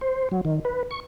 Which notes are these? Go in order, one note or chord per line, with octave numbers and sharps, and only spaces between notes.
C5
F#3
D#3
B4
C#6